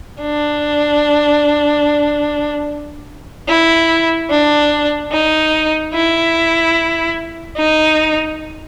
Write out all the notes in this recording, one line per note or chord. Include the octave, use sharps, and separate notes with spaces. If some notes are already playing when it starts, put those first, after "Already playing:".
D4
E4
D4
D#4
E4
D#4